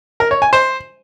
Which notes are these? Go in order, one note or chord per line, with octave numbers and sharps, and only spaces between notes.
A#4
C#5
G#5
C5